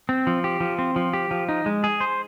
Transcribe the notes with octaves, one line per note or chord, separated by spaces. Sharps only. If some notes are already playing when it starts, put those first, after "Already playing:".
C4
F3
G4
F3
C4
F3
G4
F3
D#4
G#3
G#4
C5